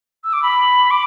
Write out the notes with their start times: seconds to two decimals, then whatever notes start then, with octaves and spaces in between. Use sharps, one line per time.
0.24 E6
0.33 D6
0.43 B5
0.91 D6